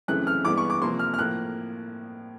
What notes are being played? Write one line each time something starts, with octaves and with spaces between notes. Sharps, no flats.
F#2 C#3 E3 A3 C4 F#6
F6
G2 E3 G#3 B3 D6
C#6
D6
C3 F3 A#3 C6
F6
F6
A2 F3 A#3 F#6